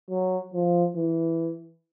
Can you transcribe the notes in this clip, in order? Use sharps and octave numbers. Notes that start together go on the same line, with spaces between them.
F#3
F3
E3